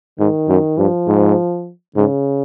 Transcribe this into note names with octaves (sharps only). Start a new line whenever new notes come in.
G#2 D#3
F#2
G2 F3
G#2
G#2 C#3